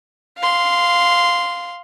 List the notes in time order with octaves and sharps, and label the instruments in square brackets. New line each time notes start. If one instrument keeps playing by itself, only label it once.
[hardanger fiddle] F5 C6